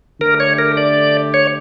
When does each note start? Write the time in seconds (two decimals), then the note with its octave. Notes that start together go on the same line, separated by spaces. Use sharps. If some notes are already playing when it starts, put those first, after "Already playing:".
0.20 D3 A3 D4 G4 A#4
0.40 C#5
0.59 A#4
0.77 D5
1.34 C#5